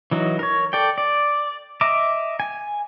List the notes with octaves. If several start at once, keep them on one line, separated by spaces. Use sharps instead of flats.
E3 F#3 D#4
A#4 C#5
A4 D5 G5
D5
D#5 E5 A#5 D6
G#5